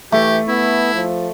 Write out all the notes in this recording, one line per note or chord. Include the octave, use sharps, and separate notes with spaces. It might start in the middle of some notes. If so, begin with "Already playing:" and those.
E3 A3 G4
B3 E4
F3